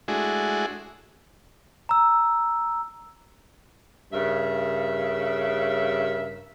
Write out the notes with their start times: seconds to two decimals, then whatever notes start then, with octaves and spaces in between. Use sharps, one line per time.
0.08 G#3 A3 D4 E4 F#4 G#4
1.89 A#5 E6
4.12 G2 C#3 A#4 E5